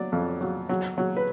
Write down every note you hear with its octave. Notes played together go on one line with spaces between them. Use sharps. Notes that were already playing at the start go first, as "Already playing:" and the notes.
Already playing: F#3 D5
F2
F#3
F#3
F#3
B4